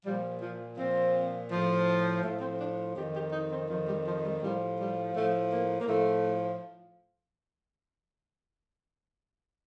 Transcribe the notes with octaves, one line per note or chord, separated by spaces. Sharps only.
A#2 F3 G3
F3
A#2 F3 C4
A2 F3
A2 F3 A3
C4
D4
F2 D#3 G4
G4
D#4
C4
F2 D#3 F3
G3
F3
G3
A2 F3 G3
G3
A2 F3 A3
A#3
A#3
A2 F3 A3